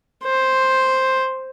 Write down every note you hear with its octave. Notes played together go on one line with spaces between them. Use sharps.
C5